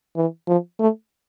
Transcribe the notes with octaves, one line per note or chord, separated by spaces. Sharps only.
E3
F3
A3